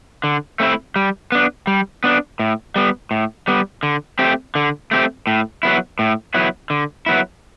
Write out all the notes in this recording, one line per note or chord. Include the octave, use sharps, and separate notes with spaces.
D3
A3 C4 E4
G3
B3 D4
G3
B3 D4
A2
G3 B3
A2
G3 B3
D3
A3 C4 G4
D3
A3 C4 G4
A2
F#3 B3 E4
A2
F#3 B3 E4
D3
F#3 B3 E4